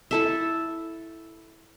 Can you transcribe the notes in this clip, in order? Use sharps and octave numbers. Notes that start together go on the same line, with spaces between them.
E4 A4 E5